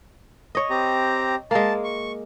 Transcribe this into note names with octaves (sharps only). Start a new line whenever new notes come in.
C#5 D#5
C4 G4 A#5
G#3 A#3 A5
C#6